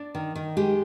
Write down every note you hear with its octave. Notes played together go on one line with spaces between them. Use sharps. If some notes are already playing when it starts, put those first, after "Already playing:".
Already playing: D4 D5
D#3
D#3
G#3 G4